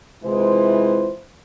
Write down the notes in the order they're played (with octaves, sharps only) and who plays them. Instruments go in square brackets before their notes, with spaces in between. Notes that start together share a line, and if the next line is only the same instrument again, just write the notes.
[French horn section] C3 E3 G#3 E4 F4 C5